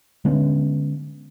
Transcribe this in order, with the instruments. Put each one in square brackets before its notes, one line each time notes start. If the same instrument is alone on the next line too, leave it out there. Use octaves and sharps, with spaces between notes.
[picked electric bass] D3 G#3 B3 C#4